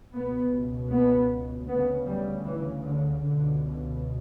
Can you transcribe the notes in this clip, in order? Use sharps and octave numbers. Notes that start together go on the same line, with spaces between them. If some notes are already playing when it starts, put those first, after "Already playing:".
C#2 B2 B3
B3
D2 C#3 B3
G3
E3
D3
C#2 B2 D3